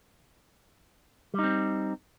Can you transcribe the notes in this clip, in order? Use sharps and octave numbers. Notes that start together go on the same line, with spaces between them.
G3 C4 D#4